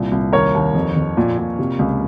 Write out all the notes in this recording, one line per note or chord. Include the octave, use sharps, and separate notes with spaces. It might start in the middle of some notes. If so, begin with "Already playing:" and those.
Already playing: C2 A#2
C2
D#2 A#4 C#5
D#2
F2
F2
A#2
A#2
C3
C#2